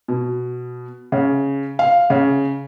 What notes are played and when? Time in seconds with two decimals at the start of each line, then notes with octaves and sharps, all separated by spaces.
0.08 B2
1.12 C#3
1.79 F5
2.10 C#3